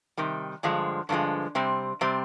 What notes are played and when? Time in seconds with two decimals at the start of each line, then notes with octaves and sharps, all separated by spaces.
0.17 C3 D#3 G3
0.63 G2 D3 F3 G#3
1.09 G2 D3 F3 G#3
1.55 C3 G3 C4
2.01 C3 G3 C4